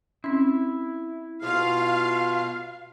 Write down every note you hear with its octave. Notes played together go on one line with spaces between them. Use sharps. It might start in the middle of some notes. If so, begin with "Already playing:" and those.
C4 C#4 E4
B2 F4 F5